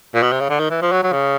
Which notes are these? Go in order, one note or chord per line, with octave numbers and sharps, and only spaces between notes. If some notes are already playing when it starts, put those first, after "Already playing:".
A#2
B2
C3
C#3
D3
D#3
E3
F3
F#3
F#3
C#3